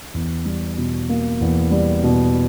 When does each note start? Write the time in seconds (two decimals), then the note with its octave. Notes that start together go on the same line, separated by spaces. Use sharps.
0.14 E2
0.45 G3
0.78 B2
1.09 A#3
1.41 E2
1.71 G3
2.04 B2